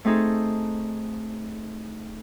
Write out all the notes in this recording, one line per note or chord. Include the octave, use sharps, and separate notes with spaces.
A3 C4 D#4 G#4 A4